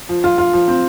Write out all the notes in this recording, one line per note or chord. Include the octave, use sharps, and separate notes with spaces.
F3
F4
F4
F3
C4